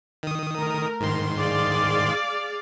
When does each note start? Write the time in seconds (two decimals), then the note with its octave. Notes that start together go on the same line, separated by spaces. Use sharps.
0.23 D#3 D#6
0.57 A3 A#4
1.00 G#2 D#3 C6
1.38 G#4 D5 F5